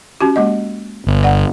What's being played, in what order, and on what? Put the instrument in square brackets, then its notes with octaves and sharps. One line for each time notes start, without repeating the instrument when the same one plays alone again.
[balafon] C#4 F#4 G4
G#3 A#3 D#5
[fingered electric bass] G1
[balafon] D5 F#5